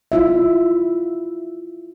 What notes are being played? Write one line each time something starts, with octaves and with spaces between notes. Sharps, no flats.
E4 F4 E5